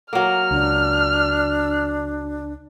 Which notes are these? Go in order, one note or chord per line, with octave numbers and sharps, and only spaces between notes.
F#3 A#3 F6
C#2 D4